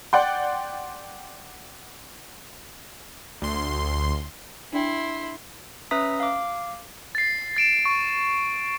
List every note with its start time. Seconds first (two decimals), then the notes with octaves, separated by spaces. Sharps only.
0.13 D5 F#5 G5 C6
3.42 D2 C6
4.73 D4 E4 G5 C6
5.91 C#4 B4 E5 A#5 D#6 B6
6.20 F5 D6
7.15 A6 C7
7.57 A6 D7 E7
7.85 C#6